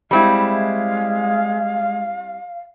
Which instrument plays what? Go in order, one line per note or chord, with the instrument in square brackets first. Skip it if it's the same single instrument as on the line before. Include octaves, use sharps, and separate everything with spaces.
[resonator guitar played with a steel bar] G3 C4 E4 [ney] G#3 [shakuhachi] F5